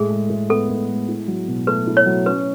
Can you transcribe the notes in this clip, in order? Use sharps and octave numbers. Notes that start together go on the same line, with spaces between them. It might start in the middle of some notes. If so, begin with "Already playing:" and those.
Already playing: A2 G#3 G#4
G#3
A2
B3 A4
A2
G#3
E4
F#3
B2
A3 B4
E4
C#5
F#3
C#4 B4